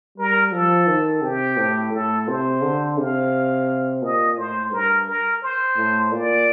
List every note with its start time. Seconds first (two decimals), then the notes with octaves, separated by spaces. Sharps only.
0.18 G3 A#4
0.52 F3 A4
0.87 D#3
1.22 C3 G4
1.57 A2
1.92 A2 A4
2.27 C3 C5
2.62 D3
2.97 C3 F5
4.02 A#2 D#5
4.37 A2 C5
4.72 G2 A#4
5.07 A#4
5.43 C5
5.77 A2
6.12 A#2 D5